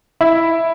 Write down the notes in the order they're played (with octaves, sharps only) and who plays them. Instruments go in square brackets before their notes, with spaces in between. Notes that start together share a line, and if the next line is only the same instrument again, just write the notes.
[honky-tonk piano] E4